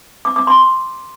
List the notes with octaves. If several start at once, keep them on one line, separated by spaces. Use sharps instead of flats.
D6
D6
C6